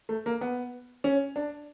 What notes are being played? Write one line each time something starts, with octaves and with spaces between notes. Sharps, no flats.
A3
A#3
B3
C#4
D4